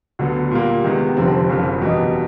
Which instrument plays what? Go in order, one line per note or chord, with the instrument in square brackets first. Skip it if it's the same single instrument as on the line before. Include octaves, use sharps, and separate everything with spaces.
[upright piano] D2 D3 F#3 B3
A#2 G3 A#3
C3 D#3 G#3 B3
F1 F2 D3 G3 C4
F#1 F2 C#3
E2 B2 G3 B3 D#4